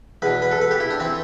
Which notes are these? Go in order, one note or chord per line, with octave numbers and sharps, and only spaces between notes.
E2 B2 B4
B4
A4
B4
G4
E4
D4
E3 C4